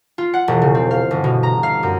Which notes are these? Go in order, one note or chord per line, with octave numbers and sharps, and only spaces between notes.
F4
F#5
E1
C#3
C4
F5
G1
B2
A#5
F5
F#2